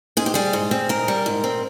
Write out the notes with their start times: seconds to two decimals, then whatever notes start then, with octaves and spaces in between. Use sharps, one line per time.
0.17 G#2 G#4
0.26 G4
0.34 G3 G#4
0.53 G#2
0.71 C4
0.89 G#2 A#4
1.08 G3
1.26 G#2
1.44 C4